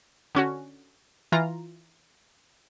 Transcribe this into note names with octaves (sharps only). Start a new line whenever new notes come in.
D3 C#4 F#4
E3 F4 A#5